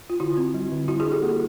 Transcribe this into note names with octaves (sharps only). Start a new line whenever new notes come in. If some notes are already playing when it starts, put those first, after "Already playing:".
F4
D3 E4 F#4
C4
G3
D3
G3 E4 F#4
F#4 G#4
D4
G4 A4
A#3